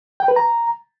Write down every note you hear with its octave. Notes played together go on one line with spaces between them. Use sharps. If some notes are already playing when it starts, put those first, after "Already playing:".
G5
B4
A#5